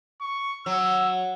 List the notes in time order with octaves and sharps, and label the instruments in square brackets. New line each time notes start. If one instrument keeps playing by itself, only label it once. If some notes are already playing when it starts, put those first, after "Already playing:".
[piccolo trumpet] C#6
[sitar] F#3 [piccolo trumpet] E6